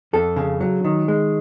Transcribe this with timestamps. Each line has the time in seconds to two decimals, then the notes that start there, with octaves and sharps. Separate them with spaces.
0.13 F2 A4
0.36 C#3
0.60 F#3
0.84 D#3
1.08 G#3